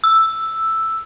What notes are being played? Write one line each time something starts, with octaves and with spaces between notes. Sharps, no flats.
E6